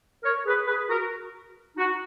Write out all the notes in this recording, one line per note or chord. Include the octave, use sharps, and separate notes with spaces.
A#4 C#5
G#4 B4
G#4 B4
F#4 A#4
D#4 F#4